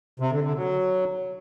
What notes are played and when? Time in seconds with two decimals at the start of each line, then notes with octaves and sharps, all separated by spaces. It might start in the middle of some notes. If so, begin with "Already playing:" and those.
0.20 C3
0.32 D3
0.44 D3
0.56 F#3